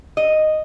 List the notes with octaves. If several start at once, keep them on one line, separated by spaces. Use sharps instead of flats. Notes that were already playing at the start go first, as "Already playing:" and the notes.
D#5